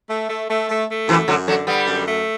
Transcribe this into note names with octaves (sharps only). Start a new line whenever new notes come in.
A3
A3
A3
A3
A3
F#2 C3 E3
F#2 D3 F#3
D3 F#3 A3
D3 G3 B3
F#2
A3